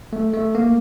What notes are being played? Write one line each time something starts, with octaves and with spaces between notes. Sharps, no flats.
A3
A3
A#3